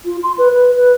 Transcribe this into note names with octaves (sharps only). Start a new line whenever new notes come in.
F4
C6
B4
B4
B4